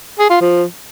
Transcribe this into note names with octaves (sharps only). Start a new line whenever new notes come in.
G#4
F4
F3